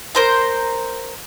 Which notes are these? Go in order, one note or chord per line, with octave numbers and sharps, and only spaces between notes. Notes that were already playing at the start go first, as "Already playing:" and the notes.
A#4 C5 A#5